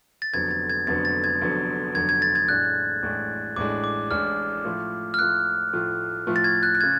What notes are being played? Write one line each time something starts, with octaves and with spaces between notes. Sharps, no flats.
A6
F1 F2 D3 F#3 B3 G#6
A6
G#6
F1 F2 D3 F#3 B3 A6
A6
G#6
F1 F2 D3 F#3 B3
F1 F2 D3 F#3 B3 G#6
G#6
A6
G#6
A1 A2 G#3 D4 F#6
A1 A2 G#3 D4
A1 A2 G#3 D4 D6
D6
A1 A2 G#3 D4 F6
A2 F3 A3 F4
F6
A2 F3 A3 F4 F#6
A2 F3 A3 F4
A2 F3 A3 F4
A6
G#6
F#6
F#6
C#3 G#6